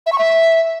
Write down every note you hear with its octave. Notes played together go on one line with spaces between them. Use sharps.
E5
C#6
E5